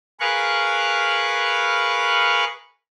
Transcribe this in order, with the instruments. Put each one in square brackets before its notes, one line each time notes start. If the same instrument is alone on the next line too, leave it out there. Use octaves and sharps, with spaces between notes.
[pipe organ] G#4 A#4 B4 F5 C#6 F#6